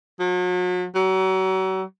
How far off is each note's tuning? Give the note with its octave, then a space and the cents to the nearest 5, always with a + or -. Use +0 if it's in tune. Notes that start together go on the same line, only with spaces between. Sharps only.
F#3 -40
F#3 +35